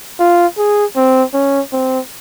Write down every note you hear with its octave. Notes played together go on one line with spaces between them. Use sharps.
F4
G#4
C4
C#4
C4